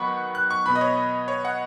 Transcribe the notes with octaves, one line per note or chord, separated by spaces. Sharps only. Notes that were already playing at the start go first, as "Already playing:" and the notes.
Already playing: D#3 F#3 B3 F#5 B5 C#6
F#6
C#6
B2 B3 B5
D#5
C#5
C#5
F#5